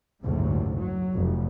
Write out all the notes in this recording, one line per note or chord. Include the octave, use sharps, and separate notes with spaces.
F#1 D2 G#2 C3
F#3
F1